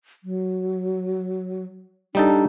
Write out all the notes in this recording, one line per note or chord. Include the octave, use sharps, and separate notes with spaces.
F#3
G3 D4 D#4 A4